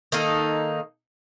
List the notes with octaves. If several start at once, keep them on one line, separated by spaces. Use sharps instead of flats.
D#3 A#3 D#4 A4